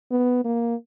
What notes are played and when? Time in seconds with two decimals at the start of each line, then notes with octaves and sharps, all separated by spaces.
0.11 B3
0.45 A#3